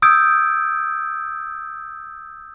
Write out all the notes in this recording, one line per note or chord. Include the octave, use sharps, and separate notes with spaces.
D#6 E6 G6 G#6 D7